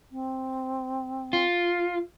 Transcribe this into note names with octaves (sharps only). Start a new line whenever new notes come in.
C4
F4